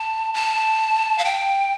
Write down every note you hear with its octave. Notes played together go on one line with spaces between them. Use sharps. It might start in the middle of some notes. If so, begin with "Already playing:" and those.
Already playing: A5
A5
F5
G5